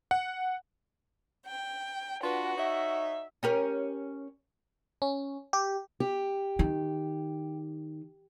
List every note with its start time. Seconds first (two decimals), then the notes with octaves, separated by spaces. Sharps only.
0.11 F#5
1.46 G5
2.23 D4 F4 F#4 B4
2.57 D#4 C#5 E5
3.43 C#4 G4 A#4
5.02 C#4
5.53 G4
6.00 G4
6.59 D#3